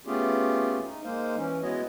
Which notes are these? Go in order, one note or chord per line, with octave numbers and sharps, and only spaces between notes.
A3 B3 C#4 F4 G4 G#4
D#4
G#3 A#3 D#4 C5 F5
E3 C#4
G#3 B3 E4 F#4 C#5 D#5